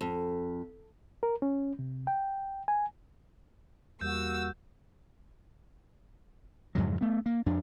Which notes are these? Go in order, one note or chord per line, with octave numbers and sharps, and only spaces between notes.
F2
A#4
C#4
C3
G5
G#5
E2 G3 A#3 F#4 E6 G6
F2 G#2 C#3 F#3
A3 B3
A#3
F2 D4